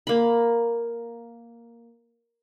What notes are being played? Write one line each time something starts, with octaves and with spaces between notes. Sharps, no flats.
A#3 B5